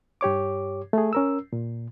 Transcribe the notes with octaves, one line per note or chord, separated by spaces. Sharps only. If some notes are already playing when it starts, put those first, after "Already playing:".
G2 G4 C#5 D6
A3 G#4
C#4 A#4 E6
A#2